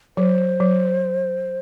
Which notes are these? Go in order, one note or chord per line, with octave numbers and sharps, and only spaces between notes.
F#3 C5
F#3